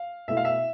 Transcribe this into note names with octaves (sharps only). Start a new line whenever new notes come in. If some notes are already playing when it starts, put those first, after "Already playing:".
Already playing: F5
B2 A3 E4 E5
F5
E5